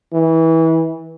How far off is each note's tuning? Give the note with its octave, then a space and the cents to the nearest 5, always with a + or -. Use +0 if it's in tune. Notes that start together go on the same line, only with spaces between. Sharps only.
E3 -25